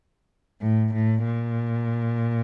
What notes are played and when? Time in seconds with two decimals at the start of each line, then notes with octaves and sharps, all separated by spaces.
0.62 A2
0.94 A2
1.25 A#2